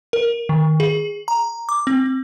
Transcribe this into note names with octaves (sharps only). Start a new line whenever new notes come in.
A#4
D#3
G#4
A#5
D6
C4